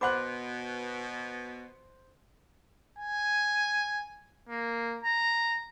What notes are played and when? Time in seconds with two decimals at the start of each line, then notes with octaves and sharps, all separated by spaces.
0.01 B2 C5 F#5 B5 D6 F#6
2.98 G#5
4.49 A#3
5.03 A#5